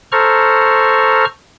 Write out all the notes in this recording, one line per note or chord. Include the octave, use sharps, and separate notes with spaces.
A4 C5 A#5 C#6 F6